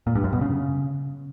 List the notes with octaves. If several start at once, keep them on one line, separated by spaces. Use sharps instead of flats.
A#2
G2
F#2
B2
C#3